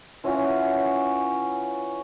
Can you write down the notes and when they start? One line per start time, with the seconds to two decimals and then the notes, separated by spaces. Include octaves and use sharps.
0.24 E3 C#4 F4 F#4